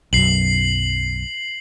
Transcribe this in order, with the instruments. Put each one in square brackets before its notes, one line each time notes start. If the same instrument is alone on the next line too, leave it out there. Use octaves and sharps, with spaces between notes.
[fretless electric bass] B1 F#2 [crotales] C7 F#7